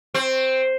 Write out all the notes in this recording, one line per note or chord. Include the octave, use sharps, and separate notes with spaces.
C4